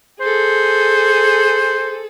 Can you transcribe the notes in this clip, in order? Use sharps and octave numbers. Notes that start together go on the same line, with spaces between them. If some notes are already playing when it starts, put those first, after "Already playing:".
G#4 A4 C5